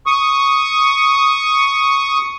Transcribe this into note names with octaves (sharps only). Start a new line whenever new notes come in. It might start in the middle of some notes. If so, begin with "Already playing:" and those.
C#6 D#6